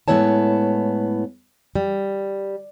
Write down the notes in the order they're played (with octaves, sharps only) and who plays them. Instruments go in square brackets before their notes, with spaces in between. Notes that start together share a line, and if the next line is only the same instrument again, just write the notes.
[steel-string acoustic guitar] A2 G#3 B3 E4 C#5 A5
G3